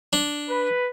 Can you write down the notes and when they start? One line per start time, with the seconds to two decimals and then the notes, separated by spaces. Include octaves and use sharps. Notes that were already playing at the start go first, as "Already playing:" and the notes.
0.13 D4
0.48 B4